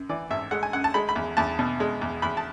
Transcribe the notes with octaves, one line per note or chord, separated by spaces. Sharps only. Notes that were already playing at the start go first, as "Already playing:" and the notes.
Already playing: F#2
E3 D5
G#1 E5
G#3 F#5
G#5
F#2 F#5
A5
G#3 B5
B5
E2
E2 A5
B2
G#3
E2
E2 B5
A5